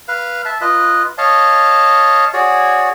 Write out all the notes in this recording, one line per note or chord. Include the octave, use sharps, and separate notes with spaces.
B4 F5
E5 A5
F4 B4 D#5
C#5 D#5 F5 A5
F#4 G#4 C#5 D5